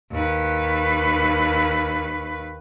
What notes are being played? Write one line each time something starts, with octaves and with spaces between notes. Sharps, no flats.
D#2 B4